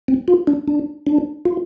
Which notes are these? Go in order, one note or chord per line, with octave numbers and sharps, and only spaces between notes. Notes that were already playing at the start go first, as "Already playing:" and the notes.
C4
F4
D4
D4
D4
F4